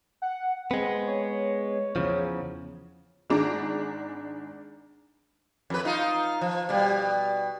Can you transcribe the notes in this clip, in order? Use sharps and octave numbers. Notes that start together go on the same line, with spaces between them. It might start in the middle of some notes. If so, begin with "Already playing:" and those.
F#5
G#3 B3 C4
C#5
E2 C#3 F3
G#1 G#3 D4 A#5 D6
F2 B4
D#4 F4
F3
B2 G3